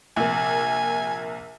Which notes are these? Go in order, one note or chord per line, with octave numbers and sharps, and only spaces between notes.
A#1 C3 A#3 G#5